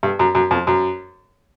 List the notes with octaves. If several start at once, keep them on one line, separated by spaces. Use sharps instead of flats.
G2
F#2
F#2
F2
F#2